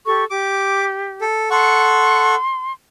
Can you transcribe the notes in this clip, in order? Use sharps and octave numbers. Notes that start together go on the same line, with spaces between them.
G4 A4 C#6
G4 D6
A4
A4 F#5 C6 C#6